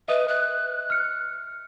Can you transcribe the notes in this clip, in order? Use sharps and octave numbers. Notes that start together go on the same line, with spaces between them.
B4 D#5 E5 D#6
F#6
F6 C#7